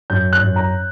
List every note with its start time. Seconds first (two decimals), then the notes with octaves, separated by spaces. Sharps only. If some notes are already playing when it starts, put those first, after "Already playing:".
0.10 F#2 G6
0.33 F#6
0.41 F#2
0.56 A#5